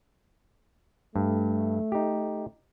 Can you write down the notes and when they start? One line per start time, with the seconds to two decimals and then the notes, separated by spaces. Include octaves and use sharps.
1.16 G2 A3
1.92 D#4 G4